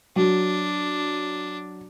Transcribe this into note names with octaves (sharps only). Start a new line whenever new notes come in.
F#3 D4